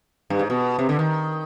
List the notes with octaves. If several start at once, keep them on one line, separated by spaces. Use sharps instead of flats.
G2
G#2
B2
C3
D3
D#3